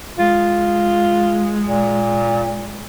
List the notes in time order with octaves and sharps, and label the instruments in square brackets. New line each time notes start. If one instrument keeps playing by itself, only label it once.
[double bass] G#3 [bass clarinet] F4
[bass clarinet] A#2